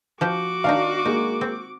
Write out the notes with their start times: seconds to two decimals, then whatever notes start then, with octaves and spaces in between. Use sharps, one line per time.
0.21 F3 F#4 G4 G5 D6
0.64 D#3 D4 D#4 F5
1.05 G#3 A#3 D#4
1.41 C4